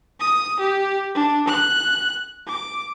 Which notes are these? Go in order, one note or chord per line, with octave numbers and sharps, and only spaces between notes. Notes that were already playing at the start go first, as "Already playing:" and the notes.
D#6
G4
D4
F#6
D6